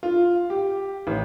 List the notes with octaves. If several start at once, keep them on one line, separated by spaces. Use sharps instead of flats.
F4
G4
A1